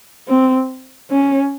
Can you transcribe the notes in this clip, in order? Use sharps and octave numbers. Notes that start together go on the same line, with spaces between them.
C4
C#4